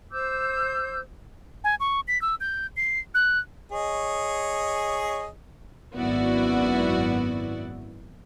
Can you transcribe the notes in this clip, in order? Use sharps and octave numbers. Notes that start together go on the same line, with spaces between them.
C5 D6 E6 G6
G#5
C#6
B6
E6
G6
C7
F#6
G#4 C#5 D#5
G#1 F#2 B3 E4 F#4 D5